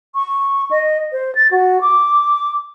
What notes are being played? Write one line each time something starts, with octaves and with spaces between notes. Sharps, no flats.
C#6
D#5
C5
A6
F#4
D6